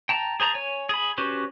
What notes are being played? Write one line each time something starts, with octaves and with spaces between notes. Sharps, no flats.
G5 A5 A#5
G#4 C5 A5 A#5
C#5 G#5
G#4 B5
C#4 F#4 G4 B4 C5